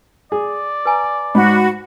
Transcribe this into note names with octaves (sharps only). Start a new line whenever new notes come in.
G#4 D5
B4 G#5 A#5
G#2 F#4 B5